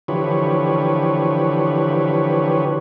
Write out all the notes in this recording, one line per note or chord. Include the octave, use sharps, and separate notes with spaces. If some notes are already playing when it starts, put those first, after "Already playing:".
D3 E3 F3 G4 B4 C#5